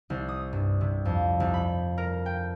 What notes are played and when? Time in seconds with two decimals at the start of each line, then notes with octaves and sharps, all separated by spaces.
0.10 C2
0.28 D#6
0.53 G2
0.81 C3
1.05 F2
1.40 C2
1.54 B5
1.98 A#4
2.26 G5